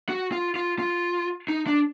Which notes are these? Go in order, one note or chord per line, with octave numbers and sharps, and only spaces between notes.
F#4
F4
F4
F4
D#4
D4